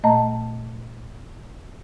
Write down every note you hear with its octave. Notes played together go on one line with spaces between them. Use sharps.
A#2 A3 D#5 A5 A#5